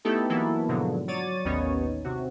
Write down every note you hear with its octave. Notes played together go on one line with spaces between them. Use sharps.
A3 B3 D#4 E4 G4 A4
E3 F#3 A#3 B3 E4 A4
G#2 B2 D3 F3 F#3
F#3 C#5 D5 A6 D#7
A1 D#2 B3 C#4 D#4 C#5
C3 F#4